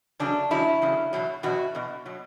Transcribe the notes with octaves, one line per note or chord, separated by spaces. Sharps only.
E2 C#3 F#3 D4
E2 C#3 F#3 E4
E2 C#3 F#3
E2 B2 F#3
E2 B2 F#3 F#4
E2 B2
B2 F#3